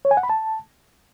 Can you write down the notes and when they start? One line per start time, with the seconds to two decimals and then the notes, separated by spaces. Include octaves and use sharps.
0.05 C#5
0.11 G#5
0.17 F#5
0.23 B5
0.30 A5